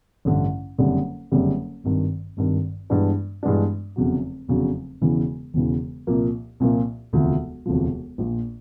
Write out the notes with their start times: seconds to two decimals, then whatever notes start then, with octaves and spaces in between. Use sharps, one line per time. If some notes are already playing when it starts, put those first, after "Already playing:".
0.25 A1 G2 D3
0.78 F#1 F2 D3 G3
1.32 F#1 F2 D3 G3
1.84 G#1 G2 D#3
2.37 G#1 G2 D#3
2.90 G2 E3 G#3 B3 D4
3.43 G2 E3 G#3 B3 D4
3.96 F1 E2 C#3 F#3
4.48 F1 E2 C#3 F#3
5.01 E1 E2 C#3 E3
5.54 E1 E2 C#3 E3
6.07 C2 A#2 F3 A#3
6.60 C2 A#2 F3 A#3
7.13 E1 D2 C3 F3
7.66 E1 D2 C3 F3
8.18 A#1 A#2 F3